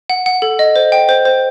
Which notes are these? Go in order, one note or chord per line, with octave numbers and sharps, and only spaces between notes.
F#5
F#5
A4
D#5
C5
G5
C5
C5